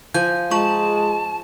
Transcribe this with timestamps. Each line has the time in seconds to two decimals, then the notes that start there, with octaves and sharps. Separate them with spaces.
0.14 F3 G#5 G6
0.51 G#3 F4 A5 C#6